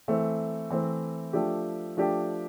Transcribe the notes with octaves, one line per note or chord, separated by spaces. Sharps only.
E3 A3 C4
E3 A3 C4
F3 A3 D4 G4
F3 A3 D4 G4